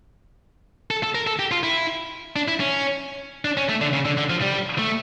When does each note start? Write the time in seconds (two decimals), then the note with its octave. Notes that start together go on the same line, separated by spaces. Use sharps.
0.91 A4
1.03 A4
1.15 A#4
1.27 A4
1.39 G4
1.51 F4
1.63 E4
2.36 D4
2.48 E4
2.60 C#4
3.45 D4
3.57 C#4
3.69 A3
3.81 D3
3.93 C#3
4.05 D3
4.18 D3
4.30 F3
4.42 G3
4.79 A3